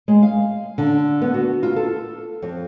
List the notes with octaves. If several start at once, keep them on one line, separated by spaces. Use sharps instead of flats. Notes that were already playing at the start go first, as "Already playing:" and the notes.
G#3
F5
D3
B3
F#4
F4
A4
F2